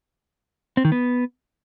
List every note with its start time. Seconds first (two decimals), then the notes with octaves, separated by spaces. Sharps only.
0.77 C4
0.85 D#3
0.92 B3